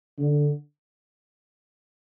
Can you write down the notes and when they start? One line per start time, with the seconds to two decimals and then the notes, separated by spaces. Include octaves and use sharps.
0.19 D3